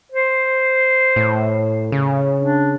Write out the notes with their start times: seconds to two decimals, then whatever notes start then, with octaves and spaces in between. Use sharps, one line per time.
0.12 C5
1.16 A2
1.92 C#3
2.38 D4